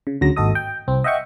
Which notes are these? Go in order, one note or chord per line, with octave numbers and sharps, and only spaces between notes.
C#3
D2 C#3 F#3 A#6
G#1 D#2 F#4 A4 D#5 D#6
G5
C2 C4
D#5 E5 F#5 G5 C#6